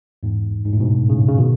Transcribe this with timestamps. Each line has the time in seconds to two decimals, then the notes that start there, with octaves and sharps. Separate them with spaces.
0.23 E2 G#2
0.65 G#2
0.73 A2
0.80 G#2 B2
1.09 A2 C#3
1.28 C#3
1.38 B2 D#3